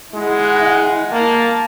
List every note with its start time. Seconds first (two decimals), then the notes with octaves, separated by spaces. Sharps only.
0.14 G#3 E4 F#5
1.12 A#3 A5